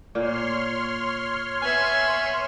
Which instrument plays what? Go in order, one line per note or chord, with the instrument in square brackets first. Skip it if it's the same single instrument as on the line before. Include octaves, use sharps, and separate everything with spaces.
[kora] A#2 A#3 [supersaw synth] C#5 C6 F6
[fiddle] B3 E5 [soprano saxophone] G#5